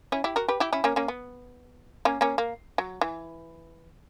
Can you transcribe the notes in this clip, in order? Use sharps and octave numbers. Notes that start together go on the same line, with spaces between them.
C#4 E4
E4 G4
F#4 A#4
G4 B4
E4 G4
C#4 E4
A#3 C#4
A#3 C#4
B3
A#3 C#4
A#3 C#4
A#3
F#3
E3